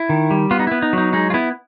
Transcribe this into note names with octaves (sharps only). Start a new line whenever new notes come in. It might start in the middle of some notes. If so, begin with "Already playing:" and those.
Already playing: E4
D#3
G3
B3 F4
D#4
B3 E4
D#4
F#3 D#4
G#3 D#4
F4
B3 E4